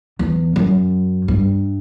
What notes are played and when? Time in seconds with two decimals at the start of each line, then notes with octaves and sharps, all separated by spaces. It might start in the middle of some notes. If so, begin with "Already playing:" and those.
0.19 E2
0.56 F#2
1.28 G2